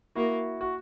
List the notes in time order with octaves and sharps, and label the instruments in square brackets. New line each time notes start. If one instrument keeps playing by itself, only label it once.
[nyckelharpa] A#3 [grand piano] E4 F#4
[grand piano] F#4